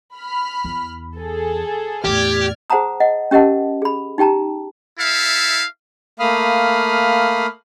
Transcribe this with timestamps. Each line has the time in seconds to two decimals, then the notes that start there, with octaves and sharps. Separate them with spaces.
0.16 B5 F6
0.64 E2
1.16 G#4 A4
2.05 E2 A2 G4 D5 F6 G#6
2.70 G#4 C5 F#5 A5 A#5 D#6
3.00 D#5 F#5
3.31 C#4 G4 A#4 D#5 F#5 A5
3.82 G#4 B5
4.18 D#4 G4 G5 A5 A#5
4.97 E4 A4 E5 F5
6.20 A3 A#3 F5 B5 D#6 F6